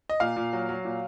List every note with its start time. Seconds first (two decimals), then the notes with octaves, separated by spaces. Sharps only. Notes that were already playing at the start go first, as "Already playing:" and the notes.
0.10 D#5
0.20 A#2 F5
0.36 A#2
0.53 F#3
0.69 F#3
0.85 A#2